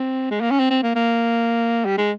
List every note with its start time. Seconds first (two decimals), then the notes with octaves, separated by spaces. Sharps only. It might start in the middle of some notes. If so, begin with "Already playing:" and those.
Already playing: C4
0.31 G#3
0.41 A#3
0.51 C#4
0.60 C4
0.70 C4
0.83 A#3
0.96 A#3
1.85 G3
1.98 G#3